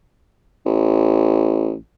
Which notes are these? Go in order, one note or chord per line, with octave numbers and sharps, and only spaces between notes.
A1